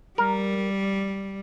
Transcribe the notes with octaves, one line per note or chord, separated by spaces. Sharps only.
G3 A#4